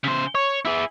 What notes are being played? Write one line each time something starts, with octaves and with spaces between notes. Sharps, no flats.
C#3 C5
C#5
E4 G#4